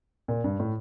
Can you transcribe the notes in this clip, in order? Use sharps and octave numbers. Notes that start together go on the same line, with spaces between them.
A#2
G2
A2